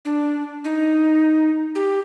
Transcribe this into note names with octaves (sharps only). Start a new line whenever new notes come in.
D4
D#4
G4